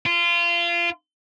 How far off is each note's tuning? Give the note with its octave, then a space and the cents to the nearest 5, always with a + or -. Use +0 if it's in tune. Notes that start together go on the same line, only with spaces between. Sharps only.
F4 -25